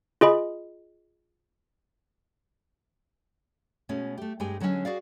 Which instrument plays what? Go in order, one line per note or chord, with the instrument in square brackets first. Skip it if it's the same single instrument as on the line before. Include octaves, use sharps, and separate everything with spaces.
[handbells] F4 G#4 D#5 B5
[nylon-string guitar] B2 G#3 A3 C#4
A3 G4
G2 G#3 C4 G4 G5 G#5
D3 F#3 G#3 A3 C#4
F#4 G#4 D5 F5